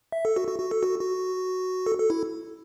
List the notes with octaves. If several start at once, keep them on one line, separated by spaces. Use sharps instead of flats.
E5
A4
F#4
F#4
F#4
A4
F#4
F#4
A4
A4
E4